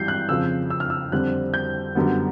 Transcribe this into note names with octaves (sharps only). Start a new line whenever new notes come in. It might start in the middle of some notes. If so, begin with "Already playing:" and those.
Already playing: G#1 G2 E3 G3 G6 C7
F#6
F2 C#3 F3 E6
E6
F6
E6
F2 D3 G3 C4 F#6
G6
F#2 D3 G3 B3